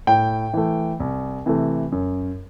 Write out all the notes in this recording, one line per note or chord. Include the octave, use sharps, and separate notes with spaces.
A2 G5
E3 A3
C2
C3 E3 A3
F#2